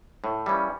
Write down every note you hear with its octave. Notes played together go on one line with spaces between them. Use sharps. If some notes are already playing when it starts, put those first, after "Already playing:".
A2
E3 G3 A#3 C#4